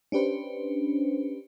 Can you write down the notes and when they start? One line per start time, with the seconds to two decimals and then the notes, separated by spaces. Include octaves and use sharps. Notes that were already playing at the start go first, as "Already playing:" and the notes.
0.12 C#4 D4 G4 B4 C5